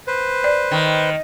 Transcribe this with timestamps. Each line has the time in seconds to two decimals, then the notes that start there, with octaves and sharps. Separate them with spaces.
0.07 B4 C5
0.44 D5
0.71 D#3